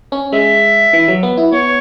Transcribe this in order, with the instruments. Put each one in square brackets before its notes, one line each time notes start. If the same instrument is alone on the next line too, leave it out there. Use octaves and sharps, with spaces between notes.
[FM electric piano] C#4
[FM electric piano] G#3 [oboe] E5
[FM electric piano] E3
F#3
B3
E4
[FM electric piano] B3 [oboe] C#5